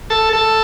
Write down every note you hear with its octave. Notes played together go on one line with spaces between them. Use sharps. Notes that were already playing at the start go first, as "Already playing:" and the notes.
A4
A4